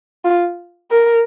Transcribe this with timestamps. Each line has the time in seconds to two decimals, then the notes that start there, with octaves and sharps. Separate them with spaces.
0.24 F4
0.91 A#4